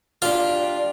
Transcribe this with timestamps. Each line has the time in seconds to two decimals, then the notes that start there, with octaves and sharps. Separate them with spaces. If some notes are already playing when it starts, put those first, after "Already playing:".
0.22 D4 F4 G4 D5